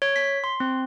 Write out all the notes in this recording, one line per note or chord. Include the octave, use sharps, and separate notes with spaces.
C#5
B6
C6
C4